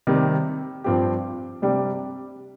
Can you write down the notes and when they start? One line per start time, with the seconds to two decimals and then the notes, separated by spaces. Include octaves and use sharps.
0.07 C3 D#3 G3
0.84 G2 F3 C4 G4
1.62 C3 G3 D4 G4